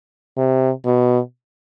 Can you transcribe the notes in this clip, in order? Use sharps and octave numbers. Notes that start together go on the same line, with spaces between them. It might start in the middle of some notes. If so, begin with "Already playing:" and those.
C3
B2